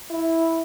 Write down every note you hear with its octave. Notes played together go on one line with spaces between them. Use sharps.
E4